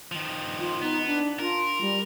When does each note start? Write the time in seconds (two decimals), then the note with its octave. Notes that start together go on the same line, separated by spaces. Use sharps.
0.12 D#3 F3
0.59 F4
0.82 B3 D#4
1.06 D4
1.39 F4 A#4
1.81 G3